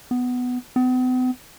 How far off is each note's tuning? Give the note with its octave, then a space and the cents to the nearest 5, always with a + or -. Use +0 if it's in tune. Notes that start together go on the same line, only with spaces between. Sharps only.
B3 +10
B3 +45